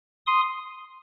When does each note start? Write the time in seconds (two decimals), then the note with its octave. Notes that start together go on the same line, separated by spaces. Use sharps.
0.26 C6 D#6